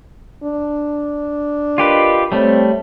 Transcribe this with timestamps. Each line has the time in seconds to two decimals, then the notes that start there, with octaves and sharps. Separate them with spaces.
0.43 D4
1.78 F4 G4 A#4 B4 D5 D#5
2.32 G3 A3 C4 C#5 G5 A5